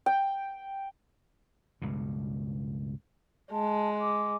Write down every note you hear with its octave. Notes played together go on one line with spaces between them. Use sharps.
G5
C#2 G2 B2
G#3 A5
D6